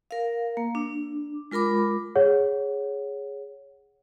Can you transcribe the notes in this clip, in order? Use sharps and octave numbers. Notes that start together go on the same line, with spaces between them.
A#4 F5
A#3
D4
G#3 F4 A#4 B5 D6
G#4 C#5 F#5